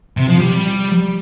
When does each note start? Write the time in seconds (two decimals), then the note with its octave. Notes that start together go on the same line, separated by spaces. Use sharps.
0.17 C3
0.28 F3
0.39 G3